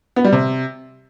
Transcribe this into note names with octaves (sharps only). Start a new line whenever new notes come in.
B3
G3
C3